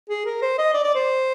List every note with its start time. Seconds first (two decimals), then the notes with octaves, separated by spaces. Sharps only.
0.09 G#4
0.26 A#4
0.42 C5
0.58 D#5
0.74 D5
0.84 D5
0.95 C5